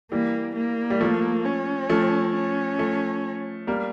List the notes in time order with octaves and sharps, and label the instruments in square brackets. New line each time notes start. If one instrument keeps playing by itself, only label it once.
[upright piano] E3 G3 [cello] A#3
[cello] A#3
[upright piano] G3
F3 A3
[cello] C#4
[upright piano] F3 A3
[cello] C#4
[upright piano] F3 A3
G3 A#3